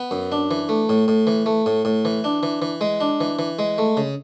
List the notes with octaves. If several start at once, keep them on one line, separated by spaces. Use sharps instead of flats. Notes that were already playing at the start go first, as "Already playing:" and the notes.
Already playing: B3
F#2
D4
E3
A3
A2
A2
E3
A3
A2
A2
E3
D4
E3
E3
G#3
D4
E3
E3
G#3
A3
C#3